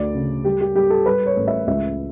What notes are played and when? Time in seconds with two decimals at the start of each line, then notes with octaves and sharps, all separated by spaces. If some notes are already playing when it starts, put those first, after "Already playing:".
Already playing: D2 D5
0.15 C#3
0.45 G3 G4
0.61 G4
0.75 G3 G4
0.90 A4
1.06 G3 B4
1.26 C#5
1.36 A1
1.48 E5
1.67 C#2 E5